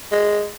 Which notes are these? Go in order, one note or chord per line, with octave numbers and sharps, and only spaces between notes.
G#3